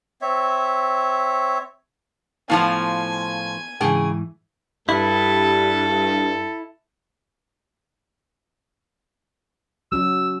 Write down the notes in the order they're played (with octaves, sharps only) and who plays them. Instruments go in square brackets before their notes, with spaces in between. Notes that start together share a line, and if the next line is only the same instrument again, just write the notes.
[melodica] C4 C#5 E5
[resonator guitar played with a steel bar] A2 F3 F4 [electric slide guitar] B3 F5 A5 [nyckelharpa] G#5
[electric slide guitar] G#2 E3 [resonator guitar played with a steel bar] C#3 G#4 G5
[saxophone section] G2 [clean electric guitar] E4 [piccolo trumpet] A4
[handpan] F#3 C#4 F#4 [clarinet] E6